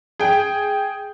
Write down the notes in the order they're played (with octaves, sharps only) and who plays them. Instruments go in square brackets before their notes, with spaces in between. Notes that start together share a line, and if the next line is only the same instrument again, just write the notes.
[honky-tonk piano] G#4 G5